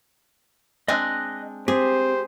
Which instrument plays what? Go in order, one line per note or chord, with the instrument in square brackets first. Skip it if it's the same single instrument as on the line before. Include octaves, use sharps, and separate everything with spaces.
[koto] G#3 C4 D4 [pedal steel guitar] D#5 F#6
[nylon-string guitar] C4 [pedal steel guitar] G4 [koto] G#4 [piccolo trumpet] C5